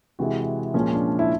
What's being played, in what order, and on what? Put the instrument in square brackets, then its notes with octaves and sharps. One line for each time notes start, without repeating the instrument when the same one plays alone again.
[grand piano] C3 E3 G#3 F#4
A#2 F3 G#3 C#4
D4
E4